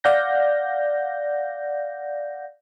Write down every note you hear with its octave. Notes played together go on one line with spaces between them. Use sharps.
D5 F5 F#5 G6 A#6